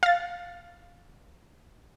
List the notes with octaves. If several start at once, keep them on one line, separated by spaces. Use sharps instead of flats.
F5 A6